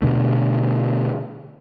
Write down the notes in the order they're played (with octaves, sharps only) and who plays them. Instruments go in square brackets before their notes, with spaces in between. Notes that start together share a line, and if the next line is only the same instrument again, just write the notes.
[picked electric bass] B2 D3 A3